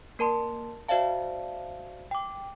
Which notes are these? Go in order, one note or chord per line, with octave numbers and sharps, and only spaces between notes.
A#3 A#4 A5 C6
F#4 C5 D5 E5 F5 A5
G5 D6